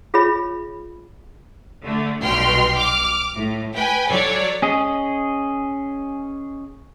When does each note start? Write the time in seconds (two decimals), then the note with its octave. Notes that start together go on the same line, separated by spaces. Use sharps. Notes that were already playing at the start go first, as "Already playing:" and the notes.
0.14 F4 G#4 C#5 E5 B5
1.83 D3 A3
2.21 B1 G2 B2 G5 C6 F6
2.76 D6 F6
3.36 A2
3.75 B4 G5 G#5 B5
4.09 F#3 A4 C#5 D5
4.62 C#4 G#4 D#5